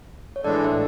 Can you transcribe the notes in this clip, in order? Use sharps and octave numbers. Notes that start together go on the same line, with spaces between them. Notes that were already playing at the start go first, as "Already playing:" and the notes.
C#5
A2 E3 G#3 D4 A4 D5
E5